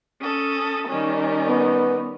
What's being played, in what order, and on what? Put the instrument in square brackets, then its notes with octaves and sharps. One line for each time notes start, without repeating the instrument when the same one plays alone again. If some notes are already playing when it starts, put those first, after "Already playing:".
[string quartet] C#4 A4 D#6
D#3 G3 C#4
[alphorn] B3